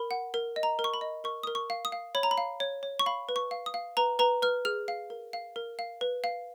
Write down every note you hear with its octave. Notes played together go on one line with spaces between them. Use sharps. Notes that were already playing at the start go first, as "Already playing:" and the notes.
Already playing: A#4 B5
F#5
A#4
D#5
A#5
A#4
C#6
B5
D#5
A#4 C#6
A#4 D#6
C#6
F5
D#6
F5
C#5 B5
A#5
B5
F5
C#5
C#5
C#6
F5 B5
B4
C#6
F5
D#6
F5
B4 A#5
B4 A#5
B4 F6
G#4 F6
F5
A#4
F5
A#4
F5
B4
F5